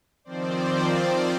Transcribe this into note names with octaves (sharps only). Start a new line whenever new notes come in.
D#3 F3 C4 C5 D5